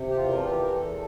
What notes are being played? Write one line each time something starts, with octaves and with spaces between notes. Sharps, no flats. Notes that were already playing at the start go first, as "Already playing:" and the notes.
Already playing: C3
G4
E2 F4
A#4
A4
E3 G4
A#4
E2 A4